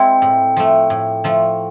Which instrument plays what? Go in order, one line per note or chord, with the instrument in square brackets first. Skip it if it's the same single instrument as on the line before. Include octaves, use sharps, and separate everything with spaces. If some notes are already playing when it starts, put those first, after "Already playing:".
Already playing: [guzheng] G#3 C4 E4 [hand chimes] G5
[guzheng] A2
F3 A3
A2
F3 A3